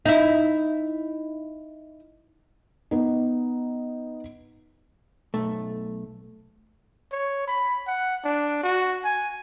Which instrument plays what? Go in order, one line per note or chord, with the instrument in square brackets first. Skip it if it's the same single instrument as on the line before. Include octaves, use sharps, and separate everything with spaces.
[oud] D#4 E4
[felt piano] B3 D#4
[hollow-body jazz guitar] B1 A3
[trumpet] C#5
B5
F#5
D4
F#4
G#5